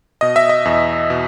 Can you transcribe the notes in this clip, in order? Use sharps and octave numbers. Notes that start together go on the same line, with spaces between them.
B2 D#5
E5
D#5
E2
B2